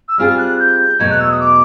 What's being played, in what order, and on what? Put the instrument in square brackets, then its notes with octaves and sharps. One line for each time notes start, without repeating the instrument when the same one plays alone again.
[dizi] E6
[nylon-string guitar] G3 C4 F4 G#4 [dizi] F6
[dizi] F#6
G6
[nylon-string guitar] E2 B2 F#3 A3 [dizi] G#6
[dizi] F#6
E6
D#6
D6